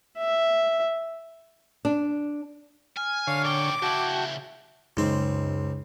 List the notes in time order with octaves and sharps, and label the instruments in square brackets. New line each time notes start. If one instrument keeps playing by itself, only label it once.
[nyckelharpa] E5
[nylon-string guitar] D4
[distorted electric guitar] G#5 [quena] F6
[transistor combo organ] D3 C#5 [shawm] F5
[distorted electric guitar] A#2 G5 [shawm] D6
[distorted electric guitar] C#3 E4 [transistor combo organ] F#4 G5 [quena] A5
[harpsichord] C#2 C4 [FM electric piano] F#2 G#3 D#4